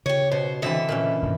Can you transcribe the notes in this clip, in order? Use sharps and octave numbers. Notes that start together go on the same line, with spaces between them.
C#3 G4 C#5
B2 C5
D3 E3 C4 D#5 E5
A#2 E3 C#4
D#1 G2